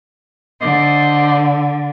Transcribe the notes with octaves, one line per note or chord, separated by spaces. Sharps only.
D3 C5 D5 D#5